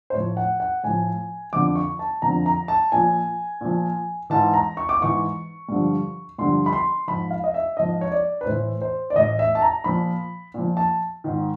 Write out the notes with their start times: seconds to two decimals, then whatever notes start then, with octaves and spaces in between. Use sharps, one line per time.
0.10 C5
0.14 A2 F3 C#5
0.37 F#5
0.60 F#5
0.83 A2 F3 G#5
1.53 F2 D3 F3 D6
1.76 C#6
1.99 A5
2.22 F2 D3 F3 A#5
2.46 A#5
2.68 A5
2.92 A#2 F3 G#5
3.61 A#2 F3
4.30 G#2 E3 A5
4.54 A#5
4.77 C#6
4.89 D6
5.00 G#2 E3 C#6
5.69 G2 D3 F3
6.38 G2 D3 F3 C6
6.66 B5
6.73 C6
7.07 G#2 F3 B5
7.31 F5
7.44 D#5
7.54 E5
7.77 G#2 F3 D#5
8.01 C#5
8.12 D5
8.41 B4
8.46 A2 E3 C5
8.82 C5
9.10 D5
9.16 A2 E3 D#5
9.39 E5
9.55 A5
9.62 A#5
9.84 A#2 F3 B5
10.54 A#2 F3
10.77 A5
11.24 G#2 D#3